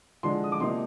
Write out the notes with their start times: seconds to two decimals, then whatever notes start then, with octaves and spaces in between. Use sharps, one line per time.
0.23 D3 F3 G#3 D4 C6
0.44 D#6
0.52 D6
0.60 C3 F3 A#3 D#4 C6